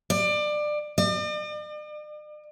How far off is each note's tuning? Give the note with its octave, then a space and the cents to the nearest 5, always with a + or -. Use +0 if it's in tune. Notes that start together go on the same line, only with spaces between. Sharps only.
D5 +25
D5 +45